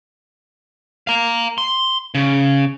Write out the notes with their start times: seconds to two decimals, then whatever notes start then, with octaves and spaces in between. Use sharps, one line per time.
1.07 F5 A#5
1.58 C6
2.15 C#3